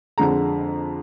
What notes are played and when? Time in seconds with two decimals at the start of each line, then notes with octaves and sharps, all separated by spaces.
0.18 F2 D3 G#3 A#5